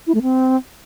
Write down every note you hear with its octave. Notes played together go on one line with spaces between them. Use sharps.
E4
A3
C4